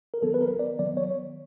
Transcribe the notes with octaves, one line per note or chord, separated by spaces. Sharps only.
A#4
D#3 F#3 B3 A4
B4
A#4
D5
D#3 F#3 B3 D5
C#5